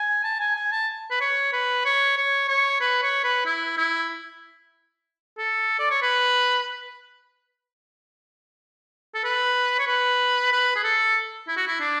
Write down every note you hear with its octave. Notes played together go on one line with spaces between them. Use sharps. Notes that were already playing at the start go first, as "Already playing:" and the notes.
Already playing: G#5
A5
G#5
G#5
A5
B4
C#5
B4
C#5
C#5
C#5
B4
C#5
B4
E4
E4
A4
D5
C#5
B4
A4
B4
C#5
B4
B4
G#4
A4
E4
F#4
E4
D4